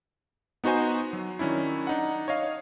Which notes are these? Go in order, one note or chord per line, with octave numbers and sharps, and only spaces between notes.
B3 D#4 F#4 C5 G#5
F#3
D#3 F#3 C#4 D4 E4
D4 D#4 F#5
C#5 D#5 F5